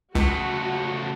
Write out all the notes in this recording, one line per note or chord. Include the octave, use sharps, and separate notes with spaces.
C#2 C#3 A3 F#4